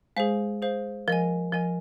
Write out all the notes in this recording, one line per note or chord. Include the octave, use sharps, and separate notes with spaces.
G#3 G#4 C5 F5
G#4 C5 F5
F3 A#4 D#5 G#5
F3 A#4 D#5 G#5